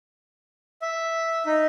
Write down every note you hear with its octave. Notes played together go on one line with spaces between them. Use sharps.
E5
D#4